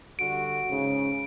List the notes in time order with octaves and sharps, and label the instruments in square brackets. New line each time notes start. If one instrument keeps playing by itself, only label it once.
[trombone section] D3 G3 F#4 [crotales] D7
[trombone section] G#2 C#3